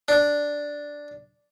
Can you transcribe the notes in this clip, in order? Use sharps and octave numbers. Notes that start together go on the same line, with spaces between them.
D4